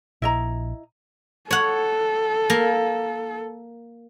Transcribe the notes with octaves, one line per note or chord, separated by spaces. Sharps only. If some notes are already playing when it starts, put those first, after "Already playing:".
A#1 E4 D#5 A#5
A4 C#5 F#5
A#3